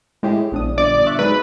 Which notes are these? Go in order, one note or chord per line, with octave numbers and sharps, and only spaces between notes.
A2 G#3 G4 G#4
E1 A#1 D4 D#6
G1 D5
E5 C#6 F#6
F#3 G#3 D#4 B4